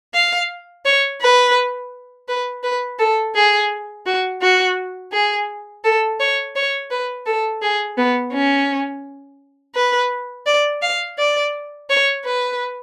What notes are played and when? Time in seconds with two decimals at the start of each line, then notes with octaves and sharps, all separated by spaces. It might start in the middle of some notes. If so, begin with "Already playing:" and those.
0.14 F5
0.85 C#5
1.21 B4
2.28 B4
2.63 B4
2.99 A4
3.35 G#4
4.06 F#4
4.42 F#4
5.12 G#4
5.84 A4
6.20 C#5
6.56 C#5
6.91 B4
7.26 A4
7.62 G#4
7.97 B3
8.33 C#4
9.75 B4
10.46 D5
10.82 F5
11.18 D5
11.89 C#5
12.24 B4